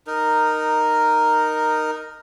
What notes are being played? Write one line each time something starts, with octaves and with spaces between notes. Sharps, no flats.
D#4 A#4